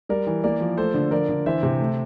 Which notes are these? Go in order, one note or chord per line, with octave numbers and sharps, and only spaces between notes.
G3 A#4 D5
E3
A#3 A#4 D5
F3
A3 A4 C5
D3
F3 A#4 D5
D3
E3 C5 E5
C3
A3